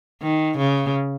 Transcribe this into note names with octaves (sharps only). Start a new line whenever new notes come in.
D#3
C#3